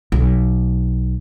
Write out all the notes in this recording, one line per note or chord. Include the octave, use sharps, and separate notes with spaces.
B1